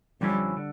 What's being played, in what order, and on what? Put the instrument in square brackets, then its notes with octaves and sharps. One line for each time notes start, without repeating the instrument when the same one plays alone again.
[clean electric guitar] F2 D3 F3 C#4 E4 [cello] G3
[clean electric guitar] D3